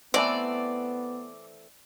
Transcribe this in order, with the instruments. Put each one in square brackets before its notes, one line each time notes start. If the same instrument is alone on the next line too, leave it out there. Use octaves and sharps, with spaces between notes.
[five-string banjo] E3 A3 C4 [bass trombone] B3 [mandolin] D5